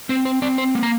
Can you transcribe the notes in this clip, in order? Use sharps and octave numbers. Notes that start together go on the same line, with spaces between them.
C4 C5
C5
C4 D5
C5
A#3
A#5